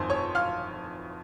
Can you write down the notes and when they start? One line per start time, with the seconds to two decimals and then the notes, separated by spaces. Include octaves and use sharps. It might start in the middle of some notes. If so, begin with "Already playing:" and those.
Already playing: G1 F2 D#3 C5 G#5 C6
0.10 C#5 C#6
0.35 F5 F6